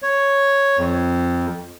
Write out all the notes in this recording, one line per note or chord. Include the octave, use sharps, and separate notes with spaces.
C#5
F2